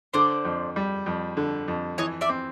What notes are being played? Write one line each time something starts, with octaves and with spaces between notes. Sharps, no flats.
D3 C5 D5
F2
G3
F2
D3
F2
E3 C#5 D#5
D5 E5
C4